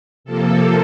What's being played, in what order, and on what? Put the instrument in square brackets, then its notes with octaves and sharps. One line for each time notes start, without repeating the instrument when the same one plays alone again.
[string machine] C3 F3 A#3 A4